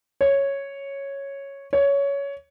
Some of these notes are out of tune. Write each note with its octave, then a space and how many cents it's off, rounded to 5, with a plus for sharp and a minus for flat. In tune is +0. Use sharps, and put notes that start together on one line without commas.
C#5 -5
C#5 +15